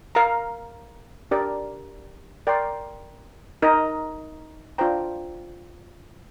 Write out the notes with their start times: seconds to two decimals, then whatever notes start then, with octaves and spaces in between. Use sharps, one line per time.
0.15 A#4 F5 A#5
1.31 D4 G4 A#4 D5
2.47 A#4 D5 G5 C6
3.62 D#4 A#4 D#5
4.78 D4 F4 C5 G5 A#5